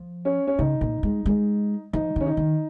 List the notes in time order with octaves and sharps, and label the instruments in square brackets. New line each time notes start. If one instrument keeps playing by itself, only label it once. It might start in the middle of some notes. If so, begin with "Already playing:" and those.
Already playing: [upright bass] F3
[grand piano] C#4
C#4
[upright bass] C#3 [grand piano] D#4
[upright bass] A#2
G#3
G#3
[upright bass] F3 [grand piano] D#4
[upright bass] D#3 [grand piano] C#4
[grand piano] D#4
[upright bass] D#3